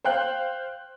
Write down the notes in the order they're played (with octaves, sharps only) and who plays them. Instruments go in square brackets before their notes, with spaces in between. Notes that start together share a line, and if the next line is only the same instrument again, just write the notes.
[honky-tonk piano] C5 F5 G5 F#6